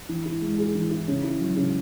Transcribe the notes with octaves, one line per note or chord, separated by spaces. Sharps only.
E3
E4
G#3
G#4
E3
E4
C#3
E4
F#3
C#3